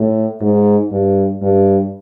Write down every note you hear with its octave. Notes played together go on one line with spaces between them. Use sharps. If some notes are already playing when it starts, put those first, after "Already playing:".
Already playing: A2
G#2
G2
G2